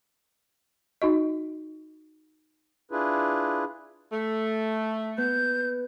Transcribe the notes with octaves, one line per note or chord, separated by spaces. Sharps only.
D#4 F#4 D#5
D4 E4 F4 G#4 B4
A3
B3 G6